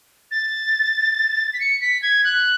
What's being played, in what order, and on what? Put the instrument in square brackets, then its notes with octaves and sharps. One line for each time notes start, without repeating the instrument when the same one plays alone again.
[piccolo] A6
B6
C#7
B6
G#6
F#6